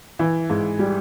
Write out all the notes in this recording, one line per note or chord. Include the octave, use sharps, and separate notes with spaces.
E3
G#2
G3